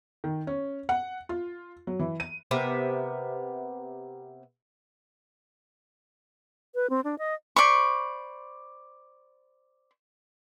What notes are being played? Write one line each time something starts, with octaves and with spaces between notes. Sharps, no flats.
D#3
C#4
F#5
F4
F#3
E3
D#7
C3 B3 A#4 E5
B4
C4
D4
D#5
C5 D5 B5 C#6